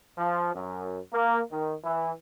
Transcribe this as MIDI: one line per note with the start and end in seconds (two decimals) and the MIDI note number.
0.17 0.51 53
0.54 0.99 42
1.12 1.40 58
1.51 1.75 51
1.84 2.12 52